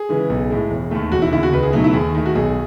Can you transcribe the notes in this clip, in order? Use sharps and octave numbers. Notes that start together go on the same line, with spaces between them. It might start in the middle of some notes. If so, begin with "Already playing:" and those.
Already playing: G#4
C#3 E3 G#3
B1
A2 G#3
E1
D#2 D#3 A3
E1 F#4
E4
D#2 C#3 E4
F#4
C#2 B4
G#4
B2 F#3 A3 D#4
E4
D#2 G#4
D#3 A3
F#4
B1 G#4